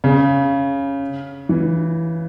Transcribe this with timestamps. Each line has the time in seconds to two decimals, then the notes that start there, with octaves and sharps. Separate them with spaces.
0.04 C#3
1.49 E3